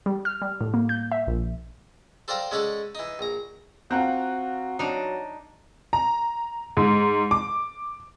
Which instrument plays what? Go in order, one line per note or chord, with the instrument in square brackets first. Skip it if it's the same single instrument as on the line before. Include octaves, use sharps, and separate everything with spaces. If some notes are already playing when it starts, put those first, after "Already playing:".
[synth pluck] G3
F6
G3
A2
A#3
G6
E5
A#1
[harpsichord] A4 C5 D5 F5 G5 A#5
G#3 C#4 A4 C#5 D5 F#5
E3 D#4
A#1 A#5
[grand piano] C4 F4 [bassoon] F#4 [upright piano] F#5 A#5 F#6
[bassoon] F#3 [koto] D4 D#4
[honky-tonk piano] A#5
G#2
D6